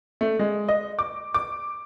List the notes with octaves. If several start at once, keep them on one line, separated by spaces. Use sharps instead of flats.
A3
G#3
D#5
D6
D6